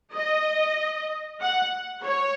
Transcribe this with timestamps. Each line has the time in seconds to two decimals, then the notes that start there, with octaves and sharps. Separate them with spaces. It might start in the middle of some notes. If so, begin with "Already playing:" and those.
0.16 D#5
1.41 F#5
2.04 C#5